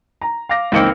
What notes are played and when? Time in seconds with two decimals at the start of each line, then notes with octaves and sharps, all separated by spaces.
0.21 A#5
0.49 F5 D6 A#6
0.72 C#2 E3 A#3 C4 D#4 C#7